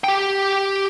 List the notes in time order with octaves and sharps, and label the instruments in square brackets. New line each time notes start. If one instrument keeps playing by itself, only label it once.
[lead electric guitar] G4 G5